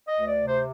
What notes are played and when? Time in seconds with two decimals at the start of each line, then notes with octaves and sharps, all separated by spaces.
0.08 D#5
0.15 D2
0.27 D5
0.41 C3
0.47 C5